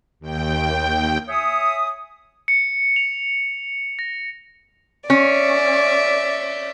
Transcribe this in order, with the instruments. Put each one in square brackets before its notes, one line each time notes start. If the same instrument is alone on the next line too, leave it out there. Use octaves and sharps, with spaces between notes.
[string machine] D#2 G5
[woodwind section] C#5 E5 G#5 D#6
[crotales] C#7
F7
A#6
[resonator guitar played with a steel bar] C#4 [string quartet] D5 E5